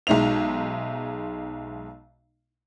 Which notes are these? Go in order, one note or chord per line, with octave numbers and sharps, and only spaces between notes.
B1 G#3 D#4 E5 F7